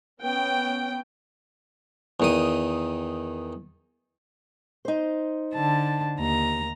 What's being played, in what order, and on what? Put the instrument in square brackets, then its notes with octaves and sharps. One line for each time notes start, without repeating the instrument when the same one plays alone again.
[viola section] B3 C#4 G5
[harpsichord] E2 D#3 D#6
[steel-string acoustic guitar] D#4 C5
[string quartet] D3 A5
D#2 A#5